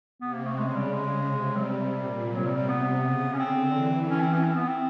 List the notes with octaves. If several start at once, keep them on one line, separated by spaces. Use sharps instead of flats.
C3 B3
A#3
A3
C#3 G#3
G3
C#3 G#3
C3
F#3
G3
A#2
C3 F#3
G3
G3
B3
C#3
C#4
D3 C4
E3
C#4
C4
C#4
C4
B3
C4